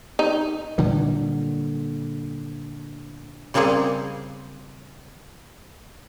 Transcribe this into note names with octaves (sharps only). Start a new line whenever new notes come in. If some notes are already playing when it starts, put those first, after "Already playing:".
D#4
A#2 D3 F#3 G3
C#3 G3 A#3 C4 G#4